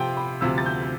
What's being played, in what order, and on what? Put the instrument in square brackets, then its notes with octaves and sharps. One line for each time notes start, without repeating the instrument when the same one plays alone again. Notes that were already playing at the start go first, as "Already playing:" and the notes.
Already playing: [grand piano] C3 F3 C4 [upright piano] G5
[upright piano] B5
[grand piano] D2 C3 F3 [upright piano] E6
[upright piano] A6
G6
G6